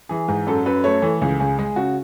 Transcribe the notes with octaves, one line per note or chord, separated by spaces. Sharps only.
E3 G#4
G#2 G#4
F#2 A4
F#2 B4
A3 C#5
E3 A4
C#2 G#4
C#2 G#4
G#3 G#4
C#3 F#4